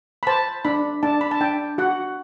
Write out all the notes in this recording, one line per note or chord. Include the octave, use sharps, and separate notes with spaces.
B5
C5 A5
D4 B5
D4 A5
B5
A5
D4 G5
F#4 F#5